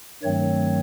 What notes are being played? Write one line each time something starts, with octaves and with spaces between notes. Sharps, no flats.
G2 D#3 F#3 A3 C4 C#5